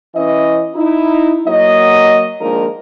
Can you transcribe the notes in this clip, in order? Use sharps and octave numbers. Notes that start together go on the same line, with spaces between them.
E3 C#4 D#5
D#4 E4
F#3 A#3 D#5
D#3 F3 G#3 A#3 D4 A#4